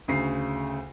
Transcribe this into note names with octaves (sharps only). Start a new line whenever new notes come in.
D2 C#3 C7